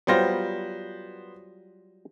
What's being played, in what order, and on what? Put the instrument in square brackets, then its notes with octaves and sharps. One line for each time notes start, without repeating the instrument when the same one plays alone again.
[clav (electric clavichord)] F#3 G3 F4 [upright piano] B3 C5 A#6